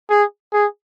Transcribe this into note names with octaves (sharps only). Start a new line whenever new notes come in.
G#4
G#4